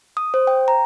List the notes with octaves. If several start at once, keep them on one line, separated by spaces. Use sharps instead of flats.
D#6
C5
G5
A#5